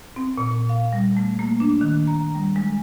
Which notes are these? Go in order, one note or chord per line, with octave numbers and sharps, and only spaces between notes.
C4
A#2
F5
G3
A3
A#3
D4
D#3
A#5
G3
G#3